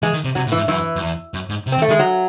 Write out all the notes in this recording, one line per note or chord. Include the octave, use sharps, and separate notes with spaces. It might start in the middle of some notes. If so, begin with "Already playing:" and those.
E3 G#3
D#3
C3
C3 F#3
A2
E3
G#2
F#2 E3
F#2
E2
F#2
G#2
C3
C4
D#3
A3
D#3 G#3
F#3